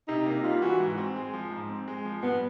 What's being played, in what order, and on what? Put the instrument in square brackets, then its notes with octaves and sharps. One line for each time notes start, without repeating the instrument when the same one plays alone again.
[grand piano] C3 [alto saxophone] D#4
[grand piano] A#3 [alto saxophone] D#4
[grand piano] G3 [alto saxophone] F4
[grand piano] E3 [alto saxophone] F#4
[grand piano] G#2
C4
G#3
F3
G#2
C4
G#3
F3
[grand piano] G2 [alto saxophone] B3